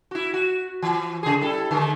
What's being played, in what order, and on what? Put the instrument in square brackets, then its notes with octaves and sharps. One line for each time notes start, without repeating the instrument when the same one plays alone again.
[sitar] E4 F#4
F#4
E3
C#3 G#4
G3 E4 A4
D3 G#3 A3